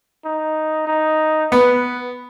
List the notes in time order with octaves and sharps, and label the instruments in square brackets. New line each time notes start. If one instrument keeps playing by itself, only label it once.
[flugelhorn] D#4
D#4
[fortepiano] B3 [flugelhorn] B4